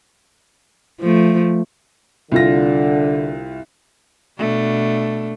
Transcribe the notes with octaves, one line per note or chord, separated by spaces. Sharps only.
F3 A3
C2 D3 F4 A#6
B2 A3 D4